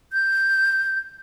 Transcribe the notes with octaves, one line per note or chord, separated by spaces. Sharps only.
G6